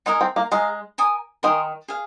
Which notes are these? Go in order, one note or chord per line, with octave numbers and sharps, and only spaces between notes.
G#3 D#4 A#4 D#5 G#5
C4
A#3
G#3 G#4 F5 A#5
A#4 G#5 D#6
D#3 A#4 G#5 C6 D#6
G#4 F5